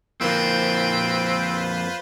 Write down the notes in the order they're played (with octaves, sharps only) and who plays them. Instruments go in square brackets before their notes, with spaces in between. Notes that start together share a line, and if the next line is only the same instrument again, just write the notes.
[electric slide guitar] F2 A#3 [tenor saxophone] C4 [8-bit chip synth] F4 B4 C5